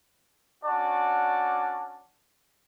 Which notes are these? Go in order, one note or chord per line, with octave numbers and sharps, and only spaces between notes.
C#4 D4 F#4 D5 A5